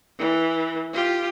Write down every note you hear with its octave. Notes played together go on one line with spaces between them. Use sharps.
E3
F4 G4